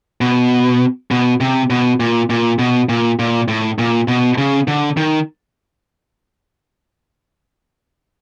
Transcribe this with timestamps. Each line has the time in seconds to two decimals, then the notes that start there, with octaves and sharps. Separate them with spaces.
0.21 B2
1.11 B2
1.41 C3
1.70 B2
2.00 A#2
2.30 A#2
2.59 B2
2.89 A#2
3.19 A#2
3.48 A2
3.79 A#2
4.08 B2
4.38 C#3
4.68 D3
4.97 D#3